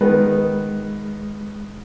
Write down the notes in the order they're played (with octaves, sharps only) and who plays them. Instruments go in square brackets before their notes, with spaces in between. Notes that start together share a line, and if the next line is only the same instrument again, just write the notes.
[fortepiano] D#3 B3 B4 [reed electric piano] G#3